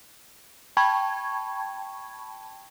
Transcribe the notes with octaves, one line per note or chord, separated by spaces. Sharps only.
G5 A5 B5 C#6 G#6